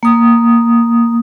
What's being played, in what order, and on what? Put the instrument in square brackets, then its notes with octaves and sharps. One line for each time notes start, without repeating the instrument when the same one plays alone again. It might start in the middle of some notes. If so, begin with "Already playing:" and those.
[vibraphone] A#3 D#6